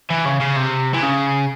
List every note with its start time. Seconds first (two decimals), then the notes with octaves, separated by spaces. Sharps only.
0.10 E3
0.25 C#3
0.41 C#3
0.56 C3
0.94 E3
1.02 C#3